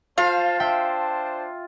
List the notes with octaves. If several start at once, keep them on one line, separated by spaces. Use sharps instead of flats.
F4 C5 F5 A5
D4 C5 E5 G5 A5 E6